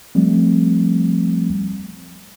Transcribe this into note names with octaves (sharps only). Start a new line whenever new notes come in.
F3 G3 A3 C4